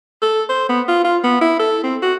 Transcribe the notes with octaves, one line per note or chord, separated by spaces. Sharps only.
A4
C5
B3
F4
F4
B3
E4
A4
C4
F#4